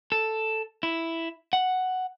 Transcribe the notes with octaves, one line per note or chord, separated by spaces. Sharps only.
A4
E4
F#5